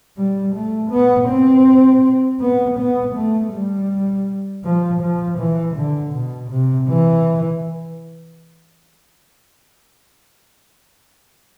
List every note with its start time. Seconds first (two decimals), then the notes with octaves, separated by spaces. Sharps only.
0.17 G3
0.55 A3
0.91 B3
1.29 C4
2.41 B3
2.78 B3
3.16 A3
3.53 G3
4.65 F3
5.01 F3
5.38 E3
5.76 D3
6.14 B2
6.51 C3
6.89 E3